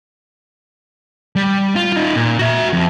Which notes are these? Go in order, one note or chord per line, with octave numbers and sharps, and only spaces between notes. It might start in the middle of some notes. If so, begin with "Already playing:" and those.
G3
F4
D#4 F4
A#2
F#4 E5
F2